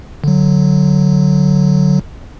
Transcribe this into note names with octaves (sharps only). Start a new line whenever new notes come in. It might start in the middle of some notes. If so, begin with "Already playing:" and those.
D3 F#3